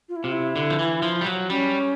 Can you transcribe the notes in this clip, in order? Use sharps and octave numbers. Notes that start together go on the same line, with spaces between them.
F4
E4
C3 F4
E4
D3
F3
E3
F3
G3
F#3
G3 C#4